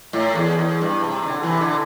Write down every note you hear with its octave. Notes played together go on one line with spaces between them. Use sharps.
A2
E2
E2
G2
C3
C3
D3
C3 E3
D3